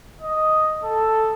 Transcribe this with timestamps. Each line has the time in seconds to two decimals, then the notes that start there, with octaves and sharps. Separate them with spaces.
0.22 D#5
0.83 A4